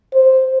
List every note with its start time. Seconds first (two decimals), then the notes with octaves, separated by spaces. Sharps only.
0.13 C5